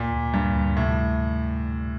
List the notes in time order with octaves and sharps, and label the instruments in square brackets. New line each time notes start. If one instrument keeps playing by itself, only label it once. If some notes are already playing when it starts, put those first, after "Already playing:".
Already playing: [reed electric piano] D2 [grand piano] A#2
[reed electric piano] D2
[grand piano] G2 [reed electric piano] G3
[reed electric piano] D2
[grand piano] A2 [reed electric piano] C3